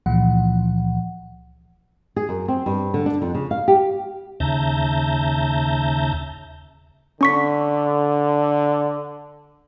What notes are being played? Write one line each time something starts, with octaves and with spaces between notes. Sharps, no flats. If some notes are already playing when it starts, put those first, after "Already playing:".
C#2 A#2 E3 F3 F#5
G#4
F#2
C4
G2
D3
D4
F2
C#3
F5
G4
D#2 C#3 E5 A5 A#5 G6
D3 C#4 C#6 B6